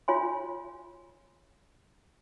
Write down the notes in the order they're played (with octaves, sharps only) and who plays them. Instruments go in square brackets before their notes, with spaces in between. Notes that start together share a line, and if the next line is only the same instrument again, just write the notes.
[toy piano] F4 C#5 G#5 C6